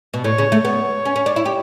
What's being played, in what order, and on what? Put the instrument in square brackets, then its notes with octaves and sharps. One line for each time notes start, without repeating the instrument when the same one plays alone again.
[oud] B2
[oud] A2 [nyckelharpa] C#5
[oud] C#3
A3
[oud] B3 [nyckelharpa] C#5
[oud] C#4
C#4
D4
E4
G4